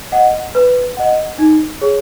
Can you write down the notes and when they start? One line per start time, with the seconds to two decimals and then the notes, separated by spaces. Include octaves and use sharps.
0.12 D#5 F#5
0.55 B4
0.97 D#5 F#5
1.39 D#4
1.81 G#4 C#5